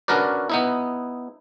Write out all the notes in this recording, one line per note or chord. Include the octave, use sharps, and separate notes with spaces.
C#4 D4 F#4 A#4 B4 D5
B3 D#4 E4